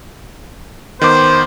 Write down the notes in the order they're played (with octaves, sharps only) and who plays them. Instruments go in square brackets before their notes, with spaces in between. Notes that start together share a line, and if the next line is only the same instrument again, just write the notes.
[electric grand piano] D#3 B3 D6 [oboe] C5